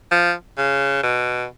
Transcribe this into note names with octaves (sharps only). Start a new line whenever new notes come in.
F3
C#3
B2